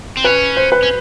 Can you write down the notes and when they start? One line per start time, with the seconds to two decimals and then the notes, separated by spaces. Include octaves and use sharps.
0.17 C4
0.24 C#4 B4
0.56 C5
0.72 B4
0.83 C#4